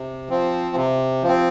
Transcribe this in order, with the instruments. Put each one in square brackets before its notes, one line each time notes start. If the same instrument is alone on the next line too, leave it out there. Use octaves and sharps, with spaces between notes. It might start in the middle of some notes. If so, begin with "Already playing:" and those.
Already playing: [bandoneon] C3
F3 C4
C3
F3
C4